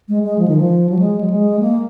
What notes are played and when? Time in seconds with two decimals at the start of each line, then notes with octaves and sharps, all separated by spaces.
0.09 G#3
0.23 G#3
0.38 F3
0.48 D#3
0.57 F3
0.90 F#3
0.99 G#3
1.21 F#3
1.30 G#3
1.60 A#3